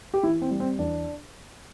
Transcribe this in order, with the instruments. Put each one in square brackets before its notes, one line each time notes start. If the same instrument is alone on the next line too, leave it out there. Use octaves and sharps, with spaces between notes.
[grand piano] G4
E3 E4
C4
G3
C4
E2 D4